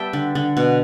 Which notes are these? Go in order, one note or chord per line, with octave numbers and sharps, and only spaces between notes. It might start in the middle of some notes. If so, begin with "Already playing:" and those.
Already playing: G3 B3 E5 G5 A5
D3
D3
B2